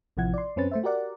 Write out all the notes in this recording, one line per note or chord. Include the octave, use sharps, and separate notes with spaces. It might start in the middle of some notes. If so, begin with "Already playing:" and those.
A1 C3 F3 E4 F#5 G#6
D5 C6
F#2 C4 C#4 B4 A6
A3 C5 E5
F#4 G4 A#4 D5 F#5